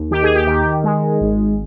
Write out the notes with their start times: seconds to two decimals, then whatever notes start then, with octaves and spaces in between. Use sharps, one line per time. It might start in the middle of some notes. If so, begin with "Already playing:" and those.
Already playing: D#2
0.11 D#3 G4
0.23 G#4
0.35 G4
0.47 D#3
0.84 G#3
1.21 G#1